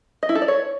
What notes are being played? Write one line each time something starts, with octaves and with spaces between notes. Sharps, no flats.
D#5
E4
A4
D5
C#5